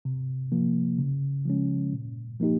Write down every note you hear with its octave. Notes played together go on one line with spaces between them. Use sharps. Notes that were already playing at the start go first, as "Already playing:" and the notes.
C3
F3 A#3
C#3
F3 G#3 C#4
A#2
F3 A#3 D#4 G4